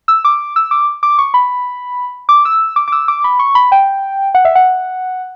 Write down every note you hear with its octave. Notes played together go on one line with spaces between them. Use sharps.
E6
D6
E6
D6
D6
C#6
B5
D6
E6
D6
D6
E6
D6
B5
C#6
B5
G5
F#5
E5
F#5